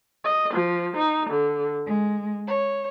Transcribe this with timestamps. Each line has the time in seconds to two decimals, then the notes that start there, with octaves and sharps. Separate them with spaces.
0.24 D#5
0.55 F3
0.97 D#4
1.29 D3
1.85 G#3
2.47 C#5